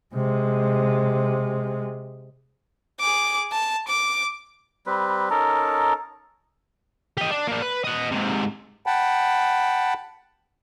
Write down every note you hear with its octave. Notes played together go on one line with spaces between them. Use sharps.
C3 G#3
G#4 D6
A5
D6
G3 C4 B4
C#4 D#4 A4 A#4
G4 D#5
D4
A#3 D4
B4
D#5 F#5
G#2 C3
F#5 G5 A5 B5